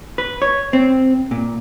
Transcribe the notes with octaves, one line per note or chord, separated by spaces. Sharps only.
B4
C#5
C4
A#2